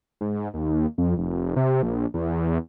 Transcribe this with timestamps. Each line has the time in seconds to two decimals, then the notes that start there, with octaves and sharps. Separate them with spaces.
0.21 G#2
0.54 D#2
0.98 F2
1.18 F1
1.56 C3
1.83 A#1
2.14 E2